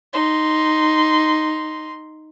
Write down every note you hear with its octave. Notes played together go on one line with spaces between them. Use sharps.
D#4 C6